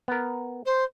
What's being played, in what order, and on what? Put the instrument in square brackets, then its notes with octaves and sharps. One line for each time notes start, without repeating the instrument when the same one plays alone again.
[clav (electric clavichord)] B3 A#4
[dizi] C5